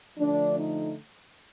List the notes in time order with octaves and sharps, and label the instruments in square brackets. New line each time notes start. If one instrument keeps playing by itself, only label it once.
[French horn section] D3 F3 A3 D4
D#4